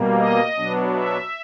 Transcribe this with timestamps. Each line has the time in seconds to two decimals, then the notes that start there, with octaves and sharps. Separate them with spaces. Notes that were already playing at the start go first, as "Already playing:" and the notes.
Already playing: B2 G3 A#3
0.18 D#5
0.55 B2 F#3 B3 D4
0.95 E5